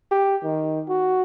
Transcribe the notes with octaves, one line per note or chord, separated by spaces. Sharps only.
G4
D#3
F#4